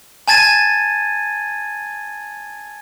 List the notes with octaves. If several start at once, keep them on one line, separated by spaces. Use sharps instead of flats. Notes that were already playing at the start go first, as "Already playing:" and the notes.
G#5 A5 G#6 A6 D#7